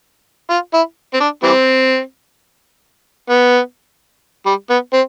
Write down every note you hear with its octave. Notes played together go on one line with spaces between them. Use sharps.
F4
E4
C4
D4
E3 G3 C4
B3
G3
B3
C4